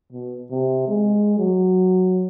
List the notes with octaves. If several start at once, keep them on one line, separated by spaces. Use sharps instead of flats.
B2
C3
G#3
F#3